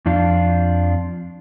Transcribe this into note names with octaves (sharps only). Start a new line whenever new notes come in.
F2 F3 D4 F4